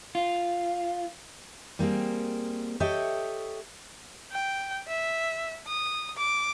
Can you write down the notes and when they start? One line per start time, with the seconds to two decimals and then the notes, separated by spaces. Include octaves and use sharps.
0.15 F4
1.79 G3 A#3 C4 G#4
2.80 G4 A4 C#5 D#5 E5 G5
4.32 G5
4.87 E5
5.68 D#6
6.17 D6